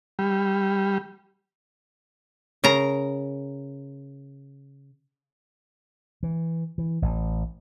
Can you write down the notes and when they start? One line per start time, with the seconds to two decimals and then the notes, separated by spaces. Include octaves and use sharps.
0.19 G3
2.64 C#3 A#4 A#5
6.23 E3
6.78 E3
7.02 A1